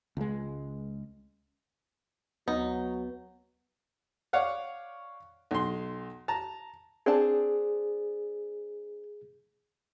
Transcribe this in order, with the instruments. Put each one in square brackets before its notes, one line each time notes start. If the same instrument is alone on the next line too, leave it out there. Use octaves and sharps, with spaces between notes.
[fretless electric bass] C#2 G#3
[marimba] D2 [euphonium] F#3 [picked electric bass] B3 [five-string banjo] D#4
[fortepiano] C#5 D5 F5 F#5
B1 C6
A5 A#5
[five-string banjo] C4 D4 A5 [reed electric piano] G#4